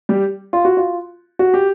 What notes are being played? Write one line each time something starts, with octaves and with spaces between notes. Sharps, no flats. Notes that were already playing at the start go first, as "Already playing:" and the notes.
G3 G4
F4
F#4
F4
F#4
G4